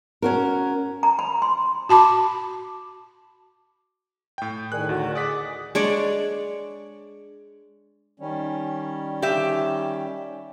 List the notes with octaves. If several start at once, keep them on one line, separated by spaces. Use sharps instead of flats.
C#4 F#4 A#4
A#5
B5
C6
F#4 A5 B5 D6
A2 G5
A2 D#3 G#4 A#4 D5 G#5 F#6
D2 F#4
G#4 D5 D#5 F#5 D6 D#6 B6
G#3 D4 C#5 D5
D#3 G3 C#4
G4 E5